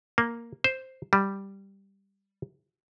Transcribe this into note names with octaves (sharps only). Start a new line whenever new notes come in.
A#3
C5
G3